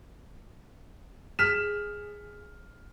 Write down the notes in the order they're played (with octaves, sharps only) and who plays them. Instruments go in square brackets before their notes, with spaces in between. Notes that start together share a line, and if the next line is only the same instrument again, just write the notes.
[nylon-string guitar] G#4 [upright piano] F6 B6 E7